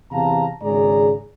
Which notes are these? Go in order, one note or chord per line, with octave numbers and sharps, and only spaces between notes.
E2 C3 F5 A5 A#5
G#1 G#2 C#3 G#4 D5 A#5